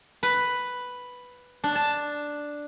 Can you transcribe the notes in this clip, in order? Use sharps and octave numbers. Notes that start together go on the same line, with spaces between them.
B4
D4
A5